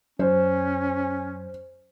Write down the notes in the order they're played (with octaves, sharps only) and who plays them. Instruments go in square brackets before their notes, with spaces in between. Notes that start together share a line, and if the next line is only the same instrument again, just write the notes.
[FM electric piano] F#2 [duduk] C#4 [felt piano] C5